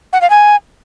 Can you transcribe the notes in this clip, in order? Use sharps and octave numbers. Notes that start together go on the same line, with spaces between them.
F#5
F5
G#5